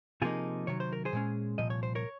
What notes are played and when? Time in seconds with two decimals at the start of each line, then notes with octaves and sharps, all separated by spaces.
0.22 C3 F3 A#3 D#4 F4 G#4
0.67 C3 D#3 F#3 C#5
0.80 C5
0.93 A#4
1.05 G#4 C5
1.13 A#2 G#3 C#4
1.58 C2 A#2 F3 D#5
1.70 C#5
1.83 C5
1.95 A#4 C#5